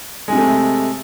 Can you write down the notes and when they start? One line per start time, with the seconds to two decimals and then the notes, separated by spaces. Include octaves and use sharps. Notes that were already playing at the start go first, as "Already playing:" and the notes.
0.28 G#3
0.32 C3
0.37 A3